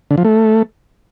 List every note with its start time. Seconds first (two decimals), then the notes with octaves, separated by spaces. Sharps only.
0.11 D3
0.18 F3
0.25 A3